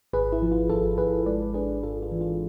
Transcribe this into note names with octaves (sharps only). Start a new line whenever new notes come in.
G#1 G#4 B4
E4
F3
F4
G#1 F4 A4
G#1 G#4 B4
G#3 B4 D5
D4 G#4 B4
G#2 F4 A4
F4
E3
F4